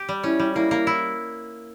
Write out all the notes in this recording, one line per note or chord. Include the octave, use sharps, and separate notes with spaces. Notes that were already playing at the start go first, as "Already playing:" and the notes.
Already playing: G4
G3
C#4 E4
G3
A#3 E4
A#3
E4